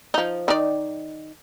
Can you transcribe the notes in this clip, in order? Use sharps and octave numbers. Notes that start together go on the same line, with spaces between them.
F3 D#4
D#3 D#4 D5